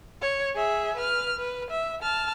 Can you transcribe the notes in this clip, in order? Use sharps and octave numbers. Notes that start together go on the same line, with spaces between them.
C#5
G#4 E5
B4 F6
B4
E5
A5 F6